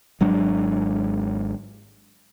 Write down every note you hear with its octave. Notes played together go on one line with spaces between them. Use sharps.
G#1 F#3 G#3 D4